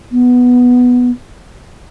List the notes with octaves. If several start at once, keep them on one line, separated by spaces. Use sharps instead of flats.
B3